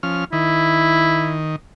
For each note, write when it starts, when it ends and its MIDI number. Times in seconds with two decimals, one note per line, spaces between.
0.03 0.24 53
0.03 0.24 61
0.03 0.24 89
0.33 1.56 51
0.33 1.39 64